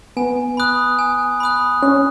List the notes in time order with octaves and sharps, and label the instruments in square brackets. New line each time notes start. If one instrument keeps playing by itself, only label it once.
[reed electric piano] B3 [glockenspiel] G#5
[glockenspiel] B5 D#6 F#6
G#5
B5 D#6 F#6
[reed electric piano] C#4 [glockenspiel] F#6